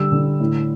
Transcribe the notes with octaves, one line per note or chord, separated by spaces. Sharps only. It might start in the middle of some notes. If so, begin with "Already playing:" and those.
Already playing: D3 G3 E6
D3
A2